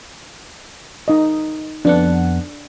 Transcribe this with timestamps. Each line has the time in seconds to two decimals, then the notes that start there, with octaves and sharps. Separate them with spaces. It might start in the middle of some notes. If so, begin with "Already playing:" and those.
1.08 D#4 D#5
1.85 F2 B3 D4 F#5